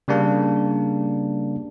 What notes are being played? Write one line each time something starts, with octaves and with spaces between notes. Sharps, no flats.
C#3 G3 A#3 D4